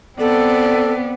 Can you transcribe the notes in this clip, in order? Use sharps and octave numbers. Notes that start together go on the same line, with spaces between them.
B3 C4 A4 D5